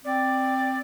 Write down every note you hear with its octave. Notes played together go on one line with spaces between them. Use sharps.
C4 D5